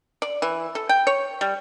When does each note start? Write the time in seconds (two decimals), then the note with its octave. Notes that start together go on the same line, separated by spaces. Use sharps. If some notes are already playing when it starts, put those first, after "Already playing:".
0.22 D5
0.42 E3
0.75 A4
0.89 G5
1.07 C#5
1.41 G3